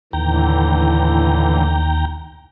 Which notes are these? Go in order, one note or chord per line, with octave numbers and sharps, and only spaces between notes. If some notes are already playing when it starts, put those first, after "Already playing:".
D#2 A2 D3 E3 G5 A#5